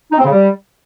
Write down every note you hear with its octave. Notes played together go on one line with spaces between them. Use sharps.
D#4
C4
C#3
G3